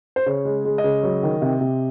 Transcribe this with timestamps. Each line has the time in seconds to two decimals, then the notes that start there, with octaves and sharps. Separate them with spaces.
0.16 C5
0.26 C#3 C#5
0.45 G#3
0.65 G#3
0.78 D#5
0.84 C#3
1.03 F#3
1.23 D#3
1.42 C3
1.61 C3